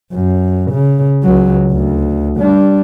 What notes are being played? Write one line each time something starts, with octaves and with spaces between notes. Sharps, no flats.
F#2
C#3
C#2 F#3
D2
G3 D4